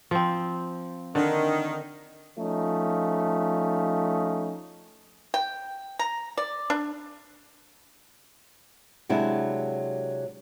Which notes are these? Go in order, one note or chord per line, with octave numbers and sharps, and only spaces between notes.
F3 C4
D3 D#3
F3 A3 C#4 D#4
G5
A#5
D5
D4
C3 F#3 G#3 D4 E4